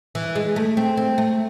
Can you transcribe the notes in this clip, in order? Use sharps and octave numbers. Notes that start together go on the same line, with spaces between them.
E3
G#3
A3
C4
C4
A3